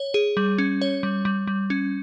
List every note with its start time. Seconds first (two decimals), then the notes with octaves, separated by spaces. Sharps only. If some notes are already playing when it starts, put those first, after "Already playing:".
Already playing: C#5
0.14 G#4
0.37 G3
0.58 C#4
0.82 C#5
1.03 G3
1.25 G3
1.47 G3
1.70 C#4